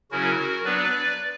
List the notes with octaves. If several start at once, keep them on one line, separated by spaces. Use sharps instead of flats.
C#3 F#3 C#4 E4 F#4 A#4
F#3 B3 D4 B4 D5